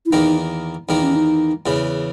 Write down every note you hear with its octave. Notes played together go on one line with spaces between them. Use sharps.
E4
E2 D#3 A#3 D#4
E2 D#3 A#3 D#4
C#4
D#4
E2 C#3 E3